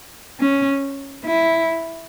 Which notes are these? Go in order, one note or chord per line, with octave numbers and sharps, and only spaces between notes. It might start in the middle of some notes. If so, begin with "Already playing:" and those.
C#4
E4